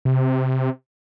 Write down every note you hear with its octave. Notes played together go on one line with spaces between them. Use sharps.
C3